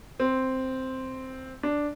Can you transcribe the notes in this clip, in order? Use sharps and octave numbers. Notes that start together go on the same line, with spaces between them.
C4
D4